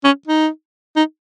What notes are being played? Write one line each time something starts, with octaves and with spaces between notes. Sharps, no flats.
C#4
D#4
D#4